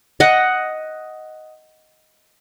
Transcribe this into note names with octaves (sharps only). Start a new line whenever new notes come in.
D#5 F#5